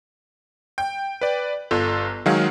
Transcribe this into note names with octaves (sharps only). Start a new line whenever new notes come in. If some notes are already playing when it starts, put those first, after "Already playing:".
G5
B4 D5
G1 F4 A4
D#3 F#3 G#3 G#4 F5 F#5